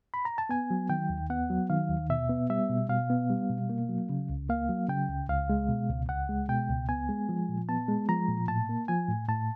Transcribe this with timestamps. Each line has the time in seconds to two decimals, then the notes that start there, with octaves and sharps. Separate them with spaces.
0.14 B5
0.25 A#5
0.38 A5
0.49 B3 G#5
0.71 F#3
0.90 D#3 G5
1.10 D#2
1.30 B3 F#5
1.50 F#3
1.70 D#3 F5
1.90 D#2
2.10 B2 E5
2.29 B3
2.50 G3 E5
2.69 B2
2.89 B2 F5
3.10 B3
3.30 G3
3.50 B2
3.70 A#3
3.89 F#3
4.09 C#3
4.30 C#2
4.49 A#3 F5
4.69 F#3
4.89 C#3 G5
5.09 C#2
5.29 C#2 F5
5.50 G#3
5.69 B2
5.89 C#2
6.09 C#2 F#5
6.29 G#3
6.49 B2 G5
6.69 C#2
6.89 B3 G#5
7.09 G#3
7.29 F3
7.49 A#2
7.69 B3 A5
7.89 G#3
8.09 F3 A#5
8.28 A#2
8.48 A2 A5
8.69 A#3
8.88 F3 G#5
9.09 A2
9.29 A2 A5